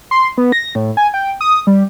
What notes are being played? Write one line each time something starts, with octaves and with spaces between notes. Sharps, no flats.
C6
B3
A#6
A2
G#5
G5
D#6
G3